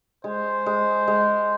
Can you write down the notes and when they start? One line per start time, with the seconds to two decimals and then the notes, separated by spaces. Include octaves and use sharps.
0.24 G#3 C5
0.66 G#3
1.07 G#3